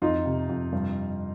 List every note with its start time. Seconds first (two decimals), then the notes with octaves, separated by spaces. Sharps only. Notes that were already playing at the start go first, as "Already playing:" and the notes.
0.02 F2 D#4 F4
0.25 C3
0.49 F2
0.73 G2